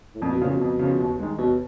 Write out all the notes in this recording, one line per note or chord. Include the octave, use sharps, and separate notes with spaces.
A2
F2 A#2
B2
A#2 C#3 F3
B2
F2
C#3 F3
D#2
D#3 G#3
D#2 B2